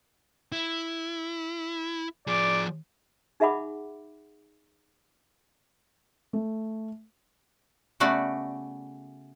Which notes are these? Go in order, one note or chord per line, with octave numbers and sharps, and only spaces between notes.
E4
F3 G#4 D5
D#4 G#4 E5 F#5 B5 D6
A3
C#3 A3 B3 F#4 D5